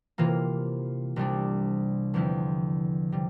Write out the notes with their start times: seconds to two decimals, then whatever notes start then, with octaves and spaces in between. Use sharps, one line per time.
0.18 C3 E3 A#3 F4
1.16 C2 C3 G3 D4
2.14 E2 D3 F3 C4 E4
3.12 C3 G3